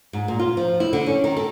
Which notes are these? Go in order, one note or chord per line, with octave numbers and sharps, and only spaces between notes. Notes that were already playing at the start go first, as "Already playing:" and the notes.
G#2
A#2
F4
F3
E4
D3
C#4
D#3
A4